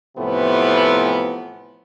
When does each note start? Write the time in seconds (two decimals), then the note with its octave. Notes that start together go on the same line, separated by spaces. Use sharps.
0.18 A2 C3 E3 F3 A3 B3